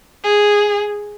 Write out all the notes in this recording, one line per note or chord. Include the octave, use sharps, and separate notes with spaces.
G#4